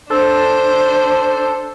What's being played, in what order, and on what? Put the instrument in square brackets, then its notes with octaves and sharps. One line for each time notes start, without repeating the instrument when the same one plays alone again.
[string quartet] D4 C5 [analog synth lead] A4